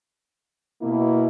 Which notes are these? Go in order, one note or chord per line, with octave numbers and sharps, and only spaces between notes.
B2 A#3 E4